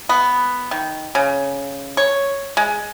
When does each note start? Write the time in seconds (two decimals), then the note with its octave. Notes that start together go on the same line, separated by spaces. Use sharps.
0.09 B3
0.71 D#3
1.15 C#3
1.97 C#5
2.57 G#3